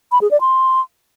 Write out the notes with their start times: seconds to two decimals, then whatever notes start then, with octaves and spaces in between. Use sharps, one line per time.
0.12 B5
0.21 G#4
0.31 D5
0.41 C6